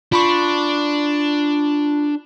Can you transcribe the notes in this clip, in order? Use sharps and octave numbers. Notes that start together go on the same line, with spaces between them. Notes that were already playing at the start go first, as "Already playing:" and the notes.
D4 F4 B5 C#6